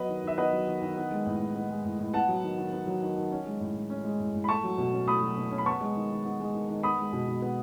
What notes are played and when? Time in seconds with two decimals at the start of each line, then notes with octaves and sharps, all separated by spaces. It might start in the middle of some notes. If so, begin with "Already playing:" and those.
Already playing: F#3 B3 B4 D#5
0.09 D#3
0.23 D#3 E5
0.38 B3 B4 D#5
0.53 F#3
0.67 D#3
0.82 D#3
0.97 B3
1.11 G#3
1.26 A2
1.40 A2
1.55 B3
1.70 G#3
1.85 A2
1.99 A2
2.14 B3 F#5 A5
2.28 F#3
2.43 D#3
2.58 D#3
2.72 B3
2.87 F#3
3.02 D#3
3.16 D#3
3.32 C#4
3.46 G#3
3.60 A2
3.75 A2
3.90 C#4
4.04 G#3
4.20 A2
4.34 A2
4.44 B5
4.48 A3 A5 C#6
4.64 F#3
4.78 B2
4.93 C#4
5.08 A3 B5 D#6
5.22 F#3
5.37 B2
5.51 C#4
5.58 B5
5.66 B3 A5 C#6
5.81 G#3
5.96 D#3
6.10 D#3
6.25 B3
6.40 G#3
6.54 D#3
6.69 D#3
6.83 B3 B5 D#6
6.98 G#3
7.13 B2
7.27 B2
7.42 B3